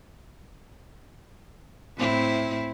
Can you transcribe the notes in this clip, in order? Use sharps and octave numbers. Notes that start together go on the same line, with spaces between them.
A2 C4 E4